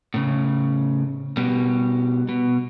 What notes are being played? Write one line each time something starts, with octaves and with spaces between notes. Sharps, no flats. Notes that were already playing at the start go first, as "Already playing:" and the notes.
A2 C#3
B2 G3
B2